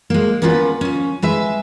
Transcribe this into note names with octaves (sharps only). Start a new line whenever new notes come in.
G#3 A#3
A#3 B3 C#4 F4 G4 B4
F3 C#4
G#3 B4 E5